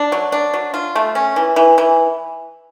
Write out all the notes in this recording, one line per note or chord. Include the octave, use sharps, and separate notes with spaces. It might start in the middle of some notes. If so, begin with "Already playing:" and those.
Already playing: D4
F#3
D4
F#3
F4
A3
C#4
E3
E3
E3